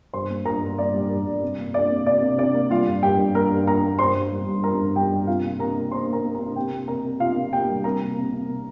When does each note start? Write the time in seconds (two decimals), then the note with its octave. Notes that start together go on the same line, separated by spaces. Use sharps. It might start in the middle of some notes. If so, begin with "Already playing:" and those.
0.13 G2 C5 C6
0.30 A#3
0.45 G2 A#4 A#5
0.62 G2
0.78 A#3 D5
0.94 G3
1.10 G2
1.26 G2
1.42 C3
1.58 A#3
1.74 A#3 D5
1.91 C3
2.06 C3 D5
2.22 C3
2.38 C3 D5
2.54 A#3
2.71 G3 F4 F5
2.86 G2
3.03 G2 G4 G5
3.19 G2
3.34 A#3 A#4 A#5
3.51 G2
3.67 A#3 A#4 A#5
3.83 A#3
3.99 G2 C5 C6
4.15 G2
4.31 G3
4.47 G2
4.64 G3 A#4 A#5
4.79 G2
4.96 G3 G4 G5
5.11 G2
5.27 C3 F4 F5
5.44 A#3
5.59 C3 A#4 A#5
5.76 A#3
5.91 A#3 C5 C6
6.08 A#3 A#4 A#5
6.24 A#3
6.35 C3 A#4 A#5
6.56 C3 G4 G5
6.72 A#3
6.88 C3 A#4 A#5
7.04 C3
7.20 C3 F4 F5
7.37 C3
7.52 A#3 G4 G5
7.69 G3
7.84 C3 A#4 A#5
8.01 A#3
8.17 C3
8.32 C3
8.49 C3